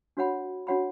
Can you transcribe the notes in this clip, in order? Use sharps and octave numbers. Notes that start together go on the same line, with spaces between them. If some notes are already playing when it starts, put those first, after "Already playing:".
D4 F#4 C#5 F#5 B5
D4 F#4 C#5 F#5 B5